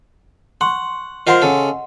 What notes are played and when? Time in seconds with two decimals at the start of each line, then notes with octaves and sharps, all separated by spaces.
0.61 F#5 C6 C#6
1.27 F4 A#4 C5 D#5 F#5 C6
1.42 C#3 A4